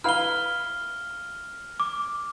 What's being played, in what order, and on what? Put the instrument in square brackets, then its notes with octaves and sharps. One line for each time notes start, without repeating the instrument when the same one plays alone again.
[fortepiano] E4 B4 F5 [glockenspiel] F6 G7
[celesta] D6